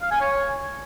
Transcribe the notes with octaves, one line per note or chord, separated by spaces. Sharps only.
F5
G#5
C#5